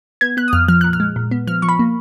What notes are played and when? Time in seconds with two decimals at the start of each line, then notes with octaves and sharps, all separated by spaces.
0.21 B3 G#6
0.37 B3 F#6
0.48 D#6
0.53 F2 F6
0.68 F3 F6
0.81 A#2 F#6
0.93 F6
1.00 G#3
1.16 A#2
1.31 B3
1.47 F3 F6
1.62 F3 C#6
1.69 B5
1.79 A#3